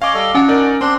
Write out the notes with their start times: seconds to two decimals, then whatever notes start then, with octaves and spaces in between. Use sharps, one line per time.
0.02 C#4 C#5 D#5 F5 D6
0.14 G3 A4 D#5
0.35 C#4 D4 F#4 G#5
0.48 D#4 A#4 D5
0.81 C4 D4 C6